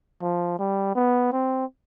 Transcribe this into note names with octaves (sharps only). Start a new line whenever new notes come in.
F3
G3
B3
C4